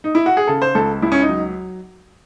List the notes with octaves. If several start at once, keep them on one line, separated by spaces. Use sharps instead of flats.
D#4
E4
F#4
G#4
C#3 A4
C5
C#2 A4
C#2 E4
C#4
D#4
F#3